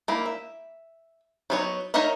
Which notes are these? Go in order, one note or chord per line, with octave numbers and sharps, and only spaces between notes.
A#3 D#4 E4
E5
F#3 B3 D4 D#4 C#5
D#4 A#4 C#5 D#5 E5